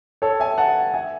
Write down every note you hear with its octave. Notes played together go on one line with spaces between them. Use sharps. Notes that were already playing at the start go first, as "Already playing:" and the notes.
A4 C#5
E5 G#5
F#5 A5
E5 G#5